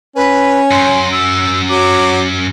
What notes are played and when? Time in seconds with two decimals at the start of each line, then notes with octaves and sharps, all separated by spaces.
0.16 C#4 B4
0.71 F#2 C6
1.12 E6
1.69 F#3 D6